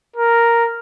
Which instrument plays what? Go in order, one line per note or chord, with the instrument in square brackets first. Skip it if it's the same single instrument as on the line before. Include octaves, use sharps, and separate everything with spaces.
[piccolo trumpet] A#4